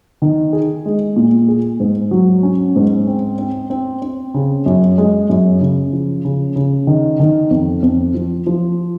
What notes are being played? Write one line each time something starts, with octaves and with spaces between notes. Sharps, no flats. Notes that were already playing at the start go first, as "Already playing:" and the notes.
D#3
G#4
G#3
A#2
G#4
G#2
F#3
C#4
G#2
C4
C4
C4
C4
C#3
F#2
G#3
F#2
C#3
F3
C#3
C#3
D#3
D#3
F2
F2
F3
F3